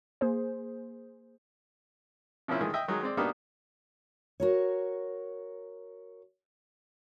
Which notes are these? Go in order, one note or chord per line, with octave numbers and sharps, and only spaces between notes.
A#3 G#4 C5
C3 F3 A#3 C#4 E4 F4
A2 D#3 E3 G#3
D#5 E5 G5
D#3 F#3 G#3 D#4
G#3 C4 D5
A#3 B3 D4 D#4 F#4 G4
F#4 A#4 C#5